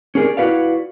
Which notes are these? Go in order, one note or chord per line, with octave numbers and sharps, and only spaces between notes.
C#4 G4 G#4 A#4 C#5 D5
E4 F#4 B4 D5 F5